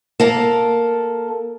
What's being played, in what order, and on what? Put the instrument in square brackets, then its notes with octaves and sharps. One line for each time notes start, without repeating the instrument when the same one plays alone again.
[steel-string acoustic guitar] A#3 A4